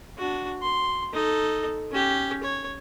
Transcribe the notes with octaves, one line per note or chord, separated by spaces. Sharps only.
D4 F#4
C6
D#4 A4
C#4 G4
C#5